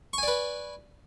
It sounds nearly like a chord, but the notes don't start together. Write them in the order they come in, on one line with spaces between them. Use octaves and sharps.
C#6 G#5 D5 B4